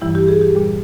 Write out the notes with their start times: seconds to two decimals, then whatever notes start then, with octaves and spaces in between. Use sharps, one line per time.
0.01 G2 E3 G3 E4
0.15 G4
0.28 G#4
0.41 G4
0.55 A#2 G3